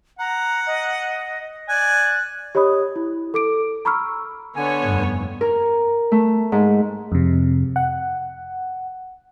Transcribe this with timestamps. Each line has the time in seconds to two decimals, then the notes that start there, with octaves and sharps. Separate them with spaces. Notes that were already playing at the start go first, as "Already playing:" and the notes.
0.19 F#5 A#5
0.67 D#5
1.69 D5 G#5 F#6
2.55 G4 C#5 D#5 B5 D#6
2.96 E4
3.34 A4 D6 D7
3.85 A#5 B5 C#6 E6 F6
4.56 D3 B3 C#5 G#5
4.85 F1 G2
5.41 A#4
6.12 A3
6.52 G#2
7.12 F2 C3
7.76 F#5